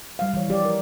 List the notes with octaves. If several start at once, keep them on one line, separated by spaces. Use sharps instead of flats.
G3 F5
E3 F3 C#5
F3 G4 D5
A#4